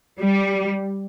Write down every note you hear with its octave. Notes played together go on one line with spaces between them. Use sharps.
G3